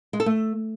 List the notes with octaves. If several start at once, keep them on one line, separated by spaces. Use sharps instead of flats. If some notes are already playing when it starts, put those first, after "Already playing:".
G#3
A4
A3